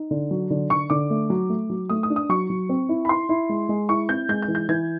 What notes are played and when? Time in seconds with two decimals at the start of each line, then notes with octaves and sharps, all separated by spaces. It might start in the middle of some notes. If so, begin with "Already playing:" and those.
Already playing: D#4
0.11 D3
0.31 F#3
0.50 D3
0.70 D3 C#6
0.90 D3 D6
1.10 A3
1.30 F#3
1.50 A3
1.70 F#3
1.89 A3 D#6
2.03 D#6
2.10 D4
2.16 D#6
2.29 F#3 C#6
2.50 F#3
2.69 C4
2.89 E4
3.05 B5
3.09 E4 C6
3.29 E4
3.49 G#3
3.69 G#3
3.89 E4 C#6
4.09 C4 G6
4.29 G#3 G6
4.42 G6
4.48 E3
4.55 G6
4.69 E3 G#6